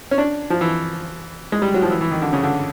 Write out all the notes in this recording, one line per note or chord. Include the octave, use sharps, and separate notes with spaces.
C#4
D4
F3
E3
G#3
G3
F#3
F3
E3
E3
D#3
D3
C#3
D3